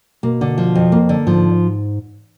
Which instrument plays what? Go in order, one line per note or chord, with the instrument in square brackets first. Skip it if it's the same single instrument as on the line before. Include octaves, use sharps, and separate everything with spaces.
[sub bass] B2 [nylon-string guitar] A#3
[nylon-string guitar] D3
F3
F2
A#3
D3
[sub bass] G#2 [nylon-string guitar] F3